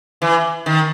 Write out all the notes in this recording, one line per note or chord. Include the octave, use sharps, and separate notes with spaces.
E3
D#3